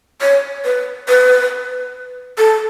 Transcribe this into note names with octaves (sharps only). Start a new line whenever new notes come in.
C#5
B4
B4
A4